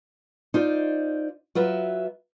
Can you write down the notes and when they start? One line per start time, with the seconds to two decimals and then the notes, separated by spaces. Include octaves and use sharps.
0.54 D#4 F4 C5 D5
1.55 F#3 F4 B4 E5